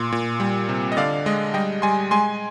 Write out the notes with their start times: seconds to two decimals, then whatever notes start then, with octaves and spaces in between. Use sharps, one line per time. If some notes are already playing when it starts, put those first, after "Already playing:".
Already playing: A#2 C6
0.12 A#2
0.40 G3
0.69 C3
0.92 D#5
0.97 D3 D5 F5
1.26 G#3 D#5
1.54 G3 D#5 G5
1.82 G3 G#5 C6
2.11 G#3 G#5 C6